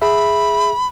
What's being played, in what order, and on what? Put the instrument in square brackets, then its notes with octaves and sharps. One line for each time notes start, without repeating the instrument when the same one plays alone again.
[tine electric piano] G#4 E5 [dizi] B5